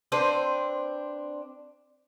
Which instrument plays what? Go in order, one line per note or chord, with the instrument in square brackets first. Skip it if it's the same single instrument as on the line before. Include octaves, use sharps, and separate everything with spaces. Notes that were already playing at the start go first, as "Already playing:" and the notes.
[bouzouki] C4 D4 B4 C5